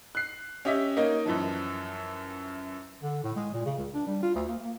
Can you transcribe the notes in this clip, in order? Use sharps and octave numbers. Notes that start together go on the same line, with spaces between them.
F#6 C7
C#4 G4 D#5 E5
A#3 D#4 C#5 D#5
F#2 E3 F3
D3
A2
G#3
A#2
C#3
C#2
D4
G3
F4
D2
A#3
A#3